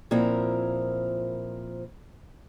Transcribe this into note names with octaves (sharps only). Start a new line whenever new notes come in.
A#2 F3 C4 E4 A#4